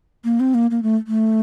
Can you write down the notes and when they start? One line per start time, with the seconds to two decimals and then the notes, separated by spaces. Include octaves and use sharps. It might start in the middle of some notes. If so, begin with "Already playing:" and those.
0.24 A#3
0.40 C4
0.54 A#3
0.71 A#3
0.83 A3
1.07 A3